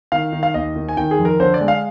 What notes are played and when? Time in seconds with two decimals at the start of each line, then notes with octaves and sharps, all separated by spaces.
0.12 D#3 F5
0.33 D#3
0.43 F5
0.54 D#2 D#5
0.76 D#3
0.89 G#5
0.97 D#3 G5
1.11 G#4
1.18 F2
1.25 A#4
1.40 D3 C5
1.54 D5
1.61 G#3
1.68 F5